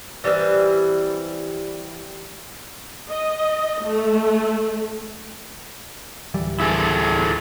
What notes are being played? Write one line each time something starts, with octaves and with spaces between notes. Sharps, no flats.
E3 G3 C4 B4
D#5
A3
D1 E3 G3
E4 G#4 A4